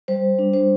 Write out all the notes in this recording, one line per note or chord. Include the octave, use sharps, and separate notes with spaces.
G3 C5
D4
C5